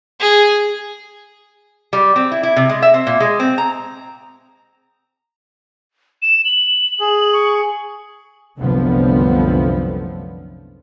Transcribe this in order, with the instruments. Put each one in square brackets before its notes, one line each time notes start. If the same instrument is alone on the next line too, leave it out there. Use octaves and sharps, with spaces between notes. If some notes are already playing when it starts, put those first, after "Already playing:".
[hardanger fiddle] G#4
[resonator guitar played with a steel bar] G3
C4
E4
E4
C3
G#3
E5
C4
A#2
G#3
C4
A#5
[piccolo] E7
F#7
[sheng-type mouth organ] G#4
[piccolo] C#6
[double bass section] C2 F#2 D3 F3 A3 B3